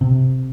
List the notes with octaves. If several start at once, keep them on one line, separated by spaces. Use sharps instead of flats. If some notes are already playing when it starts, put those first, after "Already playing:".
C3